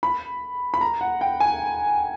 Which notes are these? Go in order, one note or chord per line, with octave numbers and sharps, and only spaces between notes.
B5
B5
A#5
F#5
G5
G#5